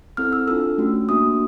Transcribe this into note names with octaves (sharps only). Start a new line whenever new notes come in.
C4 E4 A4 F6
E6
D4 F4 A4 E6
A3 C#4 F#4
A#3 D4 F#4 D#6